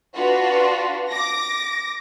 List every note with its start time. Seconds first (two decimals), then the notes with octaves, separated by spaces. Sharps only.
0.15 D4 F4 F#4 B4
1.10 D6 A#6